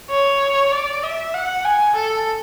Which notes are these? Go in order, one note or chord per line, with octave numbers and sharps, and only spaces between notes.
C#5
D5
E5
F#5
G#5
A4